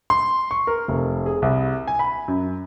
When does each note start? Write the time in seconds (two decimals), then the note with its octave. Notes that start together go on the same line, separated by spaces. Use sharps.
0.10 C6
0.51 C#6
0.67 A#4
0.88 F1
1.26 G#4
1.42 C2
1.88 G#5
1.99 B5
2.28 F#2